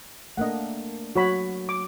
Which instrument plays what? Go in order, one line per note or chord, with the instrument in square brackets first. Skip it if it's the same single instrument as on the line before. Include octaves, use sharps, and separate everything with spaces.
[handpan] A3 A#3 D4 [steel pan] D#5 F#5
[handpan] F#3 [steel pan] F#4 C#5 B5
[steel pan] D6